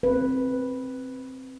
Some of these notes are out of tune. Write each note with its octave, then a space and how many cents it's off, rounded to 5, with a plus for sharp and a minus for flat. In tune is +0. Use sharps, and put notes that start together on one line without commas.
C4 +5 B4 +0